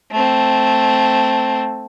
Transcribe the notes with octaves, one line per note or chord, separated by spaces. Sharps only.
A3 C4